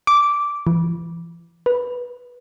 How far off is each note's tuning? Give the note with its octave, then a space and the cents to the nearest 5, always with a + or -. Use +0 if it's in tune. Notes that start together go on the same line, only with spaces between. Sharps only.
D6 -10
E3 +35
B4 -10